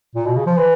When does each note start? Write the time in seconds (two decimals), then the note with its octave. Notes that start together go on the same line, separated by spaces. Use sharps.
0.15 A#2
0.26 B2
0.36 C#3
0.47 F3
0.58 E3